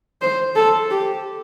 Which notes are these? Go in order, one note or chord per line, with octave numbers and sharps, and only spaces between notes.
C5
A4
G4